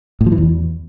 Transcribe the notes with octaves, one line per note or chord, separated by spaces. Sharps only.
A2
F3
E3
E2